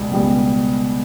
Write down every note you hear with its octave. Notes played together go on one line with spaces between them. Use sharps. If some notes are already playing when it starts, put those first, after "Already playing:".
Already playing: C#2 B2 G3 B3
C#2 B2 G3 B3